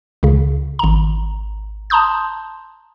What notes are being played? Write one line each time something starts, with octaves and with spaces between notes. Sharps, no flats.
C#2 C#3
G#1 A#5
A5 A#5 C6 D#6 G6